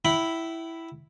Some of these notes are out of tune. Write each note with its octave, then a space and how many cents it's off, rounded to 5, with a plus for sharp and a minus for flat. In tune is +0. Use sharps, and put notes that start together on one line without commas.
E4 +0 G5 -40 B5 +0